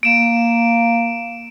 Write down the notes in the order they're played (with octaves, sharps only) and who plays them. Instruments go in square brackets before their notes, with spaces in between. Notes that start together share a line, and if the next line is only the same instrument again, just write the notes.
[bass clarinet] A#3 [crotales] D7 E7